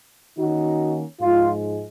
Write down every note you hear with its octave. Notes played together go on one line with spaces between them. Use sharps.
D#3 A#3 C#4 D#4 F#4
G#2 F3 G#3 F4